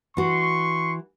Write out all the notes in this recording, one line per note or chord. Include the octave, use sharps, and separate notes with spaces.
E3 F#4 C6 C#6